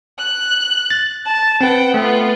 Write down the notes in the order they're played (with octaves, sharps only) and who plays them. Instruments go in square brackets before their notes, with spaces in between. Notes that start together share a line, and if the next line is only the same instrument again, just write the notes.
[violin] F#6
[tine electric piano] A6
[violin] A5
[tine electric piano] C4 B4 [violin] F#5 G5
[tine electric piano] A3 [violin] B3 F4